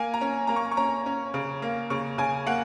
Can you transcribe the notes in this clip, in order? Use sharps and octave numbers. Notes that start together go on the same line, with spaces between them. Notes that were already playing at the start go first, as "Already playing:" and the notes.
Already playing: A#3 G#5
A#5
C#4
A#3 A#5
C#6
C#6
C#4 A#5
C#4
C#3
A#3
C#3 C#6
C#3 G#5
A#3 F#5